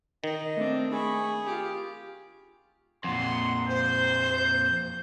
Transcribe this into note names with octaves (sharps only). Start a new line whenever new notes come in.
D#3 D#5
A3 C4 D4
G#4 B5 C#6
F4 G4
F2 A#2 F#5 C6
C5 G6